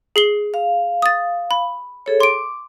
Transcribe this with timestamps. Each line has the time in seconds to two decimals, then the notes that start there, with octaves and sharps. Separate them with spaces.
0.16 G#4 C7 G7
0.54 F5
1.02 D#6 A6
1.51 B5
2.06 G#4 A4 C#5
2.20 C6 D6 D7